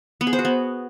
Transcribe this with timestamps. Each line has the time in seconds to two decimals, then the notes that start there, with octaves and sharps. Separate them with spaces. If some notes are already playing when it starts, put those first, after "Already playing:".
0.21 B3
0.27 G#4
0.33 C5
0.39 F#4
0.45 B3